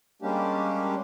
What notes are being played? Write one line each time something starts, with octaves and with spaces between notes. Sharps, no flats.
G3 G#3 A#3 C#4 D4 G4